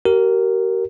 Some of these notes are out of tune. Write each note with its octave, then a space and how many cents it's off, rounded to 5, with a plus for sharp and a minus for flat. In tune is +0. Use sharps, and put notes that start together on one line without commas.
G4 -40 A#4 -5